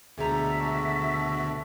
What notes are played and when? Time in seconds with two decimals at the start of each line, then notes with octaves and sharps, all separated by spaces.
0.18 D2 B2 D3 G#3 G4 D5 E5 A#5
0.59 F#4 A4